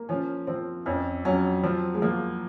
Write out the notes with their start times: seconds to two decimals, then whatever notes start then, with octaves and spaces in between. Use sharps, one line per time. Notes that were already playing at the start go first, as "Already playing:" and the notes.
Already playing: A#3
0.09 F3 C#4
0.47 F3 C4
0.86 F2 C#4
1.25 F#3 C#4
1.63 F3 C4
1.94 G#3
2.02 F3 A#3